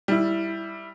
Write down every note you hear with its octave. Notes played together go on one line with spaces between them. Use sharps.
G3 E4